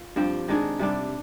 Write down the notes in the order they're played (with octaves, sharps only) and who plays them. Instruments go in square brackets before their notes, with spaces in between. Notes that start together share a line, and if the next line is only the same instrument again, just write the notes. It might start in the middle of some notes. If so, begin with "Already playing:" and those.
Already playing: [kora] F4
G2 F3 C4 G4
D#3 G#3 D4 G#4
C3 G3 D4